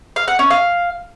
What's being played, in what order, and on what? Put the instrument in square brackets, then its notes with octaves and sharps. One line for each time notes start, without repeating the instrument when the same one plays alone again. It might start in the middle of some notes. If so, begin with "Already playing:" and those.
[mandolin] F5
F#5
C#4
F5